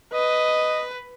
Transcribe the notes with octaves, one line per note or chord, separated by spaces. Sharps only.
B4 D#5